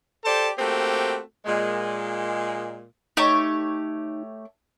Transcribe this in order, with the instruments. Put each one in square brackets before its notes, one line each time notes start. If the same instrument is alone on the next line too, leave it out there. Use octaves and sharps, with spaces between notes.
[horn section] G4 A4 C5 D5 A5
A3 A#3 C4 F#4 G4
A#2 G#3
[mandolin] A3 G4 C#5 [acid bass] D#4